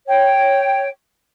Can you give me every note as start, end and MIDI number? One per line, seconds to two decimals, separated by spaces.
0.07 0.87 73
0.07 0.87 79